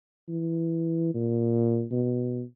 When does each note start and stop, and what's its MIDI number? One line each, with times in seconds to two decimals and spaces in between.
0.28 1.13 52
1.14 1.84 46
1.91 2.43 47